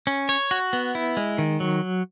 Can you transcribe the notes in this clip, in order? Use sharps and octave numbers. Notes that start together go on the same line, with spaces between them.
C#4
C#5
F#4
B3
E4
G#3
D#3
F#3